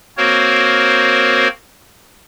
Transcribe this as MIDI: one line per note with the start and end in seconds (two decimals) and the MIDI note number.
0.17 1.48 58
0.17 1.48 60
0.17 1.48 66
0.17 1.48 70
0.17 1.48 72
0.17 1.48 73